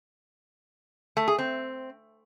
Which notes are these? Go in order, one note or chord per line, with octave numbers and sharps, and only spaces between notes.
A3
G#4
C4